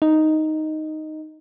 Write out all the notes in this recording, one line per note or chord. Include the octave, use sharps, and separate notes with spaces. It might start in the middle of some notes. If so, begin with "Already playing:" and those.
D#4